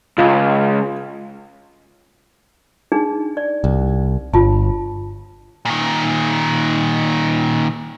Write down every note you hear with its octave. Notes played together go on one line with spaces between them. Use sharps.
C#2 F4
D4 D#4 G#4
D5
C2
G1 F4 A5
A#2 D#3